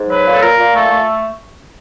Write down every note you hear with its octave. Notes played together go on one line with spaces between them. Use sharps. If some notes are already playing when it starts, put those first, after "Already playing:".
Already playing: G#2
F#3 B4
A#2
A4
A#2 A#4
A#2
A3 A4
A3